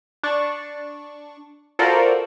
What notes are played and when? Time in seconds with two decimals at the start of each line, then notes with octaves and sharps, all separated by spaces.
0.24 D4 C#6 A6
1.79 F4 F#4 A4 A#4 C5 D5